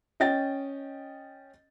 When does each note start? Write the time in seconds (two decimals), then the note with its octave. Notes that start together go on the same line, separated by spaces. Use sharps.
0.20 C#4 D#5 G5 A6